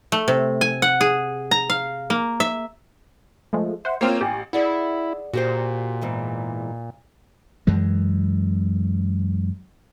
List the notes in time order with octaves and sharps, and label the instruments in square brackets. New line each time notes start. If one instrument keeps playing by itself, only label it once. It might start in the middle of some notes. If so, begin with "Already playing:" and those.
[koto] A3
C3
G#5
F#5
G#4
A#5
F5
A#3
E5
[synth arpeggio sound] F3 G#3 A3
[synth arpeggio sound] C5 F#5 [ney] E5
[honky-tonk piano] A#3 C4 F4 [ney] C5 [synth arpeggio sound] C#5 F6
[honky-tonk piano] A1 [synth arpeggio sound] G4 [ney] G#5
[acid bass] E4 [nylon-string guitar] G#4 D5 F#5
[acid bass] A#2 [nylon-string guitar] F#4 G4 C5
[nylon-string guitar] E2 G#2 E3
[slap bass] F#2 E3 G#3